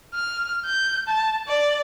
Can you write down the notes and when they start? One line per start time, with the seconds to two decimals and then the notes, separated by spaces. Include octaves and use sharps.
0.14 F6
0.66 G6
1.08 A5
1.47 D5